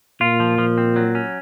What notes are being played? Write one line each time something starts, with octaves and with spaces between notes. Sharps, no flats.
A#2 F4
F3
F3
C4
F#3
C#4